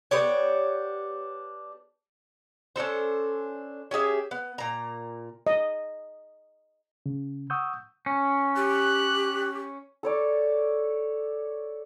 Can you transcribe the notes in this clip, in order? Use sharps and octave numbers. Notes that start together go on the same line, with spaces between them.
B3 D4 G4 C#5
C#4 D4 A4 C5
C#4 G4 G#4 E5
B3
A#2 A#5
D#5
C#3
F#5 C#6 D#6 E6 G6
C#4
G4 F#6
A4 C#5 D5